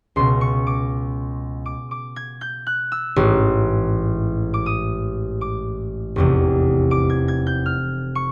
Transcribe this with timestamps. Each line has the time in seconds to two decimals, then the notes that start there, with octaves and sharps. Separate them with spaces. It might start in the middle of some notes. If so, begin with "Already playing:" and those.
0.16 C#2 B2 C6
0.41 C#6
0.67 D6
1.66 D6
1.91 D6
2.16 G#6
2.41 G6
2.67 F#6
2.92 E6
3.16 A1 G#2 E3
4.54 D6
4.66 D#6
5.41 D6
6.16 F1 E2 C3
6.91 D6
7.10 G#6
7.28 G#6
7.47 G6
7.66 F6
8.15 C#6